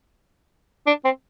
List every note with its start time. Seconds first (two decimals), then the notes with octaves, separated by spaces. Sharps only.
0.87 D4
1.05 C4